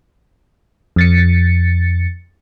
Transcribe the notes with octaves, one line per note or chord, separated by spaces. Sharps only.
F2 A6 C#7